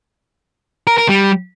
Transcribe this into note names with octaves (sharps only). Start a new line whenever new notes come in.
A#4
A#4
G3